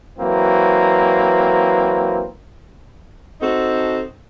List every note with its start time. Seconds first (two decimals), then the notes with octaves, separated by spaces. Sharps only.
0.19 E3 F#3 A#3 C4
3.41 C4 D#4 F#4 A4